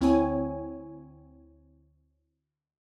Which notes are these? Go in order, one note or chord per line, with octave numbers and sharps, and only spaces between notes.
D2 C4 E4 C#5 G#5